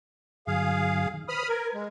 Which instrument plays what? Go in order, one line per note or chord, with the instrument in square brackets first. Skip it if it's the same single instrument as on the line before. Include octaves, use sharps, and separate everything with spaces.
[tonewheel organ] G2 D3 F#3 [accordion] G#4 F5
[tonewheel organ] D#3
[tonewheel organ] B4 C5 [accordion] B5 D#6 F6
[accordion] A#4 [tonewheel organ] B4 G#6
[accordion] G#3